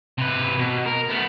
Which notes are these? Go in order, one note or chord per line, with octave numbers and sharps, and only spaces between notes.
C3 B4
B2
A#4
A3 B3